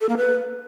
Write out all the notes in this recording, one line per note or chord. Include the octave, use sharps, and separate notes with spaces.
A4
A#3
B4